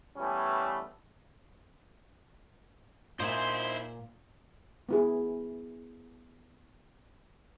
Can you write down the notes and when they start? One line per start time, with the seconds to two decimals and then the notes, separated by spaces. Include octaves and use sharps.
0.17 E3 G3 A3 B3 C#4
3.20 A#2 D#4 E4 C5 G#5
4.89 B3 E4 G#4